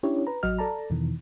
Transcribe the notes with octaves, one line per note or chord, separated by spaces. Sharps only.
C#4 D4 E4 G4 C#5
B4 A#5
A1 F#3 F#4 D#5 F6
A4 D5 A5 A#5
E2 B2 D#3 E3